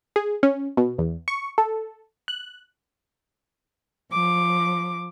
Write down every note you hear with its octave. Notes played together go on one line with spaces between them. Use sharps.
G#4
C#4
B2
E2
C#6
A4
F#6
F3 D6